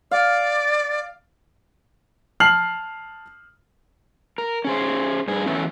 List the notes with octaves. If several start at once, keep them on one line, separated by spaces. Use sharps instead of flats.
D5 F5
A5 F6 C7 F#7
A#4
C#4 G#4 C5
G2 G#4
E3 F#3 A3 B3 C#4